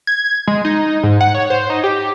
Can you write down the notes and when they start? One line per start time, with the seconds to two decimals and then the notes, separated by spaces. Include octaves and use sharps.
0.07 G#6
0.48 G#3
0.65 D#4
1.03 G#2
1.21 F#5
1.35 C#5
1.50 C5
1.70 D#4
1.84 G4